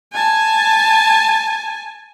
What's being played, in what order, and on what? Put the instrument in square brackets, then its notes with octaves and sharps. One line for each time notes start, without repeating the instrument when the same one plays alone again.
[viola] G#5 A5